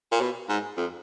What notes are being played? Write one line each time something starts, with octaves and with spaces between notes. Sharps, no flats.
A#2
B2
G#2
F2